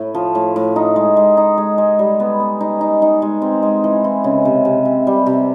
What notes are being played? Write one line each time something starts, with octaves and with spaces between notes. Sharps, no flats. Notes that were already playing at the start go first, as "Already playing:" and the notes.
Already playing: A2 A3
F3
A2
A2
D#4
G#3
G#3
D#4
G#3
G#3
G3
B3
B3
D#4
D#4
D#4
G#3
C4
G#3
E3
E3
C#3
C3
C3
C3
G3
C3